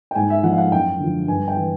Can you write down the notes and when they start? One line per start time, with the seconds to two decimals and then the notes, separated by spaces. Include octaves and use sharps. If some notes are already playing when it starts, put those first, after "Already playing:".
0.11 G5
0.15 G#2 G#5
0.30 E5
0.43 F3 F#5
0.53 F5
0.58 F#5
0.72 F#2 G5
0.99 D3 F3
1.28 G2 G#5
1.48 G5
1.57 E3